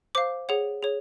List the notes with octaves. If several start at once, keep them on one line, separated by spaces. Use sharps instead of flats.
C5 F5 D6
G#4 C#5 F#5
G#4 C#5